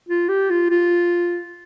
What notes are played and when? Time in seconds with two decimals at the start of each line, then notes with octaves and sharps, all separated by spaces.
0.09 F4
0.29 G4
0.50 F4
0.70 F4